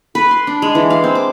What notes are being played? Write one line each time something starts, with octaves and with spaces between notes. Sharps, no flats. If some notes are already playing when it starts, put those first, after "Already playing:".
B4
C6
D4
G#3
E3
F5
C4
D6